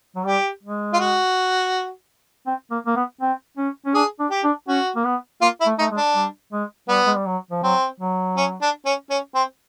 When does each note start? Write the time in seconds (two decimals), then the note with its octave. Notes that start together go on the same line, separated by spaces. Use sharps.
0.16 F#3
0.25 G3 G4
0.63 G#3
0.94 F4
0.99 F#4
2.47 C4
2.71 A#3
2.86 A#3
2.96 B3
3.21 C4
3.57 C#4
3.86 C#4
3.94 D4 G#4
4.19 D4
4.31 G4
4.44 D4
4.68 C#4 F#4
4.96 A#3
5.05 B3
5.42 A#3 F4
5.61 E4
5.66 A3
5.79 A3 D#4
5.91 G#3
5.97 D4
6.15 G3
6.53 G#3
6.89 G3 B3
7.06 G#3
7.16 G3
7.26 F#3
7.51 F3
7.63 F#3 C4
8.00 F#3
8.37 C#4
8.62 D4
8.86 C#4
9.10 C#4
9.35 C4